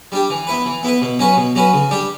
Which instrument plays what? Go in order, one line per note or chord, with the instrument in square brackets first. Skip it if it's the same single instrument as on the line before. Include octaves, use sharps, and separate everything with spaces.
[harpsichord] G3 D4 G4
E3
B3 E4 B4
E3
B3 E4 B4
B2
F#3 C#4 F#4 B4
B2
F#3 C#4 F#4 B4
C#3
G3 D4 G4